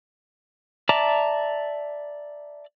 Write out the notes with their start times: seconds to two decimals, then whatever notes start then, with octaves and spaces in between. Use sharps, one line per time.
0.89 D5 E5 A5 A#5 D6